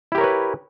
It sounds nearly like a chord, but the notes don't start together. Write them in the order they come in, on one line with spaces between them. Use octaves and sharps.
E4 G4 A#4 C#5 B4